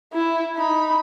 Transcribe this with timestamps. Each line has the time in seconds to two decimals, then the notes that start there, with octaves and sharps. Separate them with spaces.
0.13 E4
0.57 D#4 B5